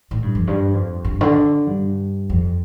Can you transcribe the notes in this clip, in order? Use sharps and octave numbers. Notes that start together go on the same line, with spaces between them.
A2
G2
F2
G2
F2
G2
D3
G2
F2